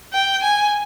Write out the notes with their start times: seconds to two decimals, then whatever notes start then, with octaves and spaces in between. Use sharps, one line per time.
0.13 G5
0.43 G#5